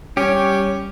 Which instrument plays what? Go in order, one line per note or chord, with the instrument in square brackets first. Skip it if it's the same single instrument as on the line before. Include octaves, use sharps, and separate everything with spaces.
[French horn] G3 [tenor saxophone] C#4 [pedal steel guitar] G4 C#5